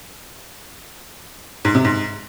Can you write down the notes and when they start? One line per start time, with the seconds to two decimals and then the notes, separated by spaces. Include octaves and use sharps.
1.65 G#2
1.75 C3
1.85 G#2